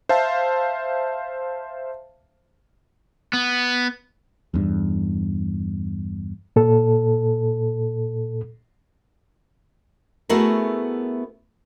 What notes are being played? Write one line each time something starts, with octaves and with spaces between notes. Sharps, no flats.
C5 E5 F5 A5
B3
E2 G2
A#2 A4
A3 B3 E4 F#4 G#4 A#4